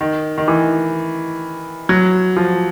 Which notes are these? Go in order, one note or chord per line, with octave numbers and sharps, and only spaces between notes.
D#3
D#3
E3
F#3
F3